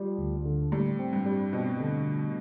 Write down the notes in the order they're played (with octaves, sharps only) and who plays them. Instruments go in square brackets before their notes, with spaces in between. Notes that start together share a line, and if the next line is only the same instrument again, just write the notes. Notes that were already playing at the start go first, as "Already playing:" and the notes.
Already playing: [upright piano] F3 [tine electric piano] G3
[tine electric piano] D2
D3
[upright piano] A2 [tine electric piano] G3
[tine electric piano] C4
[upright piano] G2
[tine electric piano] G3
[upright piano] B2 [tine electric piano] C4
[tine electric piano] D3